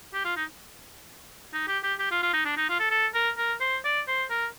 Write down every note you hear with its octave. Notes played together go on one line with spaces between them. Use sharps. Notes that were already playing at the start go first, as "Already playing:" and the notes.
G4
F4
D#4
D#4
G4
G4
G4
F4
F4
D#4
D4
D#4
F4
A4
A4
A#4
A#4
C5
D5
C5
A#4